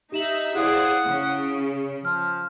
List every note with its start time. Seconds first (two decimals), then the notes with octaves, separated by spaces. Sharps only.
0.12 D#4 G4 E5 E7 F#7
0.55 E4 G#4 C5 D5 F5 F#5 D#6
1.06 C#3
2.05 F3 F6